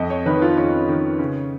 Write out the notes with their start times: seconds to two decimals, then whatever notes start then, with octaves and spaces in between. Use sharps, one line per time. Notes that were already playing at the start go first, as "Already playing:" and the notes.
Already playing: F2 D#5
0.10 C#5
0.26 D#3 B4
0.42 F4
0.57 F2 C#4
0.89 D#3
1.19 C#3